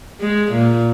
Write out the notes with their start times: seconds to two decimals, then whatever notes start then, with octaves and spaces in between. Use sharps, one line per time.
0.21 G#3
0.52 A#2